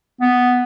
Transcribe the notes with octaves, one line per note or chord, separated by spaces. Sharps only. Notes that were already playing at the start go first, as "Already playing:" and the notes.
B3